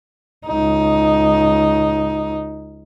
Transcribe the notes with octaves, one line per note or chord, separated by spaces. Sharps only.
C#2 D#4